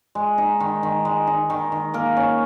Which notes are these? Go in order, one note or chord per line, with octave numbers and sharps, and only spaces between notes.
G#3
D#4
D#3
D#3
G#3
D#4
D#3
D#3
A#3 A#4
C#4